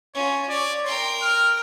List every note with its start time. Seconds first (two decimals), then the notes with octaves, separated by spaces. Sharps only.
0.15 C#4 F4 C#5
0.49 C#5 D5
0.86 A#4 G5 C6
1.22 F6